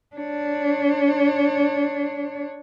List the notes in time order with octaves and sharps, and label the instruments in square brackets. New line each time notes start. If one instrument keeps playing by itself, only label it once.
[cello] D4 C#5